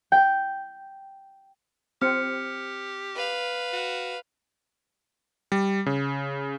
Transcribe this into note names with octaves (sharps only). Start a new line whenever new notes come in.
G5
C4 G4 F6 C#7
B4 F5
F#4
G3
C#3